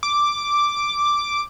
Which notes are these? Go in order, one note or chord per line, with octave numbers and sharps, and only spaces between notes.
D6